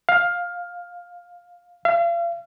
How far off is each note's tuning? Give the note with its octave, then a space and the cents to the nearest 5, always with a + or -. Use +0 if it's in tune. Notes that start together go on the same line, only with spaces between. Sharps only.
F5 +10
F5 -40